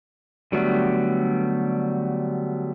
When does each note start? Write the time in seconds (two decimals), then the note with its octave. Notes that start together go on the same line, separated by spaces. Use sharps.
0.52 D3 F#3 G3 A3 B3